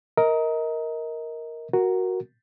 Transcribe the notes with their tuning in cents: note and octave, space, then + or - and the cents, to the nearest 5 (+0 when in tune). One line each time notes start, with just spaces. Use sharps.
A#4 +0 D#5 +30
F#4 +0 A#4 +0